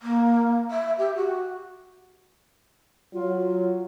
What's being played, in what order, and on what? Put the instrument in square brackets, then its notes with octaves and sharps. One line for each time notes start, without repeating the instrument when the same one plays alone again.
[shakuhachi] A#3
E5
G4
F#4
[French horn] F#3 [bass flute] F4